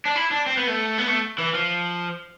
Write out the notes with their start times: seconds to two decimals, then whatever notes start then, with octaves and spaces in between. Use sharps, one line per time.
0.05 D4
0.16 E4
0.31 D4
0.46 C4
0.57 B3
0.67 A3
0.98 B3
1.08 A3
1.38 E3
1.54 F3